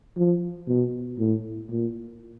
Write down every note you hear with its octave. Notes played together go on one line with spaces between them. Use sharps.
F3
B2
A2
A#2